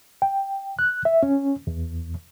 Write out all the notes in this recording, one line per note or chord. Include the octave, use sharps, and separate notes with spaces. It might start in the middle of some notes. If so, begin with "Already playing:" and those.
G5
F#6
E5
C#4
E2